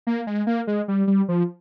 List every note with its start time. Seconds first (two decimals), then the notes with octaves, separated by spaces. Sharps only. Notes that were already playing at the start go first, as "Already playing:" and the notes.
0.07 A#3
0.27 G#3
0.47 A#3
0.67 G#3
0.88 G3
1.07 G3
1.29 F3